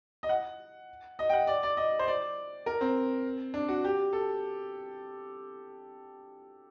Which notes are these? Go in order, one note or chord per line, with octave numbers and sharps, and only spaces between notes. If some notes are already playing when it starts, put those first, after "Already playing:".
D#5
F#5
D#5
G5
F#5
D5
D5
D#5
C5
D5
A#4
C4
D4
F#4
G4
A4